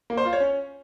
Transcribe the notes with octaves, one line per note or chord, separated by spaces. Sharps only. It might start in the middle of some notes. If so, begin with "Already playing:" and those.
A#3
C5
F4
C#5
C#4